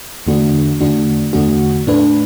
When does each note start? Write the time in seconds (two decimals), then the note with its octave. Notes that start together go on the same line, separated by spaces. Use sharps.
0.27 E2 D3 A3 D4 F#4
0.80 E2 D3 A3 D4 F#4
1.33 E2 D3 A3 D4 F#4
1.87 A2 A3 D4 B4